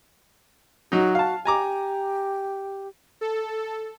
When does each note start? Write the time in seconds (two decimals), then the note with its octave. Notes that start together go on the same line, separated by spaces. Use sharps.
0.92 F#3 D#4 F#4
1.15 F5 A5
1.45 G4 G#5 A#5 D6
3.21 A4